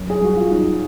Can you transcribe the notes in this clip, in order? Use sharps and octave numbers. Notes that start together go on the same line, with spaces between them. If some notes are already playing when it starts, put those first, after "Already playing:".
Already playing: F#2
G#4
F#2 F#4
F4
F#2 D#4